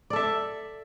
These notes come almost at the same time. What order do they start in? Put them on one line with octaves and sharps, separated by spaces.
D5 A4 E5